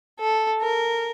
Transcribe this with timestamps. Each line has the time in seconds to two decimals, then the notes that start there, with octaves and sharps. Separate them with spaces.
0.20 A4
0.61 A#4